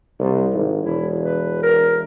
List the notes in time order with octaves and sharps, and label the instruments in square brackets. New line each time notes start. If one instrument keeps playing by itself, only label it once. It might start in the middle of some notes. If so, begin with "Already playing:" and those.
[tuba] C2
G#1
[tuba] E1 [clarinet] E4
[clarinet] B4
A#4